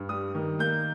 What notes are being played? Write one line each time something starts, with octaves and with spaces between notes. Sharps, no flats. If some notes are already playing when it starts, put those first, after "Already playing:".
Already playing: G2
G3 D#6
D#3
A#3 G6